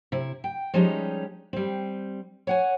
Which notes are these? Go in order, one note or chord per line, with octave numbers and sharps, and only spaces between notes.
C3 E4
G5
F3 G3 G#3 C#4 D#4 G4
G3 C4
C#5 F#5 G#5